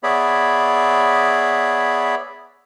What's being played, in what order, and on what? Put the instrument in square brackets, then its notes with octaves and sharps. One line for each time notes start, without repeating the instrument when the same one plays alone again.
[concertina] B3 G#4 C#5 D5 E5 B5